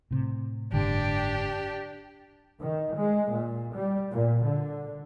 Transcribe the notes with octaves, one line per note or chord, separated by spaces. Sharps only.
A2 C3
F#1 G#2 D3 D4 G4
D#3
G#3
A#2
G3
A#2
D3